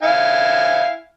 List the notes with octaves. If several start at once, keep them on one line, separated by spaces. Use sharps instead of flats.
E4 F5 G#5